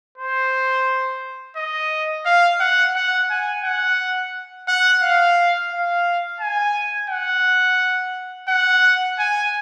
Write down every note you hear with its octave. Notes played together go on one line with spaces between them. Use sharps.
C5
D#5
F5
F#5
F#5
G#5
F#5
F#5
F5
F5
G#5
F#5
F#5
G#5